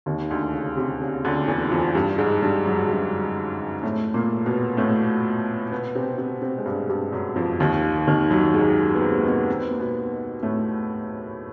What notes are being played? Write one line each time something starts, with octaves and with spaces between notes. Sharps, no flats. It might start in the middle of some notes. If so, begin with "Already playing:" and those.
D#2 D#3
D2 D3
C#3
C3
C#3
D2 D3
E2 E3
F2 F3
G2 G3
G#2 G#3
G2 G3
F#2 F#3
G2 G3
A2 A3
A#2 A#3
B2 B3
A2 A3
B2 B3
C3 C4
C3 C4
C3 C4
G#3
G2 G3
G2 G3
F#2 F#3
F2 F3
D#2 D#3
D#2 D#3
F#2 F#3
G#2 G#3
B3
C3 C4
A#3
B2 B3
C4
B3
A#3
B2 B3
A2 A3